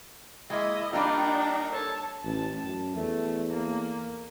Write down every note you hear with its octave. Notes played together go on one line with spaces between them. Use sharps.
G#3 A#3 E4 D#5
G3 A#3 D4 D#4 F4 A#4 G5
A4 C#5 A5
A1 A5
F#2
E2 A3
A#3